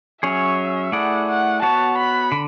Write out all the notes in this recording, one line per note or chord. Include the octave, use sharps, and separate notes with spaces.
F#3 C#4 G#4 C#5 E5
A3 E4 G#4 D5 F#5
F#5
B3 F#4 C#5 A5
B5
D3